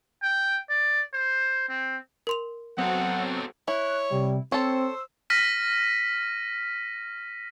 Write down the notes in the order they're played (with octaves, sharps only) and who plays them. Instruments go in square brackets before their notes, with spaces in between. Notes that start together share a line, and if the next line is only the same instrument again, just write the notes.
[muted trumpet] G5
D5
C5
C4
[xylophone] A#4 C6 F7
[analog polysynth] F#3 C4 [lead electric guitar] B3 A4 [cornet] F#5
[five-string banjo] E4 [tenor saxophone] C#5 [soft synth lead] F#6
[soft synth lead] C3 [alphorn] G3
[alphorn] C4 [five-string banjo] A4 C#5 [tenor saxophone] C5 [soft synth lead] E6
[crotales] F6 A#6 B6 D#7